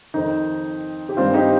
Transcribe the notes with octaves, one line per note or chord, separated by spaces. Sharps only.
F2 D#3 D#4
G4
G2 D#3 C4 F4
D#4 G4